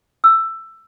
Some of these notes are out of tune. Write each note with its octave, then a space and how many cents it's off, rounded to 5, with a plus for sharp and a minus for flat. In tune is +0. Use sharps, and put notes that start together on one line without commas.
E6 +10